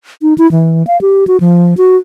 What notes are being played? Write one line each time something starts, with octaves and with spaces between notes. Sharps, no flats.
D#4
E4
E3
F5
G4
F#4
F3
F#4